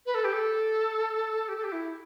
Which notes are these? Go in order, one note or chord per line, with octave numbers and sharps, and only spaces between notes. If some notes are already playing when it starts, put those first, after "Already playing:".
B4
A4
G4
A4
G4
A4
G4
E4